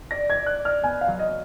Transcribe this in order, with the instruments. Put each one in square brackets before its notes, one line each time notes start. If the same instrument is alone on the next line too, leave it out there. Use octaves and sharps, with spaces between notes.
[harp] D5 [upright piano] A#6
[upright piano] G#6
[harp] D5
[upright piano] F#6
[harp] D5
[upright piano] F6
[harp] B3 [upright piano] G#5
[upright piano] F5
[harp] F#3
[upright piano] D#5